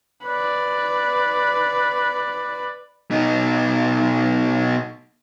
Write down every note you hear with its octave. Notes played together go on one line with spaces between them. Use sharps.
B4 D5
B2 D#4